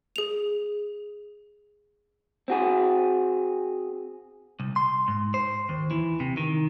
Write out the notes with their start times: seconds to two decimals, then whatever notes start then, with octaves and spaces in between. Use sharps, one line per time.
0.16 G#4 F7
2.48 C4 F#4 G#4
4.60 C2
4.76 C6
5.08 G#2
5.34 C5
5.69 D#2
5.91 E3
6.20 C3
6.37 D#3